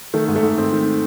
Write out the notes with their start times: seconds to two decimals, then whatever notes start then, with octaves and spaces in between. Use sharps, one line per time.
0.14 D#3 A3
0.28 G#2
0.36 A3
0.43 G#2
0.58 D#3 C4
0.72 D#3